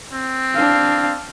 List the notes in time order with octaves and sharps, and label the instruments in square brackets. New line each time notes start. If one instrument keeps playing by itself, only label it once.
[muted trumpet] C4
[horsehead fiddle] D4 F5